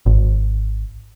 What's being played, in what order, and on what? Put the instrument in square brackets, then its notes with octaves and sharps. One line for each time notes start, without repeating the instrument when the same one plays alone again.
[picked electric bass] G#1